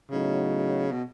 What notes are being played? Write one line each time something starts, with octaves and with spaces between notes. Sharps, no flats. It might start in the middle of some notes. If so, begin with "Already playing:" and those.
A2 C#3 F#3 B3 D#4
B2